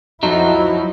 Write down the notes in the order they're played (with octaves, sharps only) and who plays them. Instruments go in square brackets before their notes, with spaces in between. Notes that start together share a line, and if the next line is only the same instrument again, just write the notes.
[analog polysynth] F2 F3 F#4 [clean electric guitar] F#3 D#4 [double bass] E4